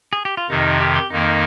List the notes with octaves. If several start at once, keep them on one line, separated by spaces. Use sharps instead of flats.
G#4
G4
F4
F2 C3 D#3 D#4
G4
G4
F2 D#3 A#3 D#4